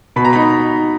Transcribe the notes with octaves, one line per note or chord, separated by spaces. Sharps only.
B2 B5
A#5
D#4 B5